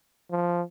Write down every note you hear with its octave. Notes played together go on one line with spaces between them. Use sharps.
F3